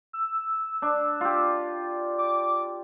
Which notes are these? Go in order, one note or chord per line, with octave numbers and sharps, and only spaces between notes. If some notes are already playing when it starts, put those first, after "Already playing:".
E6
D4
F4 G4
D6